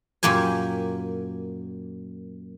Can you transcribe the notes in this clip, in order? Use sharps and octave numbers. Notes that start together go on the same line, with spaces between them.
F#2 A#2 A#3 G4 G#5